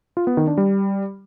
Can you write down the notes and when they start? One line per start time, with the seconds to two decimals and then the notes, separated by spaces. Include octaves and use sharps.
0.17 F4
0.27 B3
0.37 D#3
0.47 D4
0.57 G3